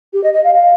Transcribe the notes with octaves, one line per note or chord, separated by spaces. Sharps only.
G4
D#5
D#5
F5
F5